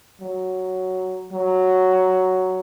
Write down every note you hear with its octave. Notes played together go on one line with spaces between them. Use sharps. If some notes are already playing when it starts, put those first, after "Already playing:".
F#3
F#3